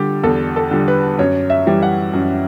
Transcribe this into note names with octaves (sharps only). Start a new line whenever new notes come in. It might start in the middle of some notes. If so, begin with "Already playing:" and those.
Already playing: D3 G3 G4
E2 A4
A4
D3 G3
B4
F#2 C#5
E5
E3 G3
F#5
F#2